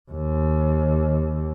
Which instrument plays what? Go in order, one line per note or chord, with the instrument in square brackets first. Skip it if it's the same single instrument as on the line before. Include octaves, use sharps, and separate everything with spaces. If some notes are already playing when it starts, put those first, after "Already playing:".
[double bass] D#2